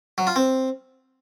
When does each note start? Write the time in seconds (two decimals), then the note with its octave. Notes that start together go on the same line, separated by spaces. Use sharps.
0.18 F#3
0.27 F4
0.36 C4